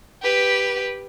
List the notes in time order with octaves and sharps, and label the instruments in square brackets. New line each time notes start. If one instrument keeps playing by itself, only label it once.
[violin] G4 B4